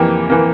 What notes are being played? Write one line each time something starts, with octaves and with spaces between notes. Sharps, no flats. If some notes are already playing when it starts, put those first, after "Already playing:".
Already playing: F2 E3 A#3 G4
E3 A#3